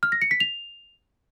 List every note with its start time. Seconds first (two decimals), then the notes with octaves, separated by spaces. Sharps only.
0.03 F6
0.12 A#6
0.22 C#7
0.31 B6
0.40 F7